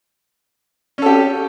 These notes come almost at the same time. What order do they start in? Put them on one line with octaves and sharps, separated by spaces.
C#4 A4 G4